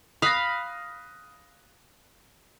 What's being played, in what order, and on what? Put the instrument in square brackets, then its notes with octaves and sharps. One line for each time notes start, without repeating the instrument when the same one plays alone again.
[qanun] F5 B5 [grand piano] D#6 F#6 A#6